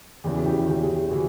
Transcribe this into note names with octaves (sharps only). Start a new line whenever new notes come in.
E2 C#3 E3 G4
F#4
G4
F#4
E2 C#3 E3 G4
G#4
G4
C#3 E3 F#4